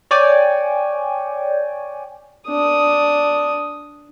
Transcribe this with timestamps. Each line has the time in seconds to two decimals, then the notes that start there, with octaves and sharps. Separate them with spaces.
0.11 C#5 D5 G5 G#5
2.49 D4 D#6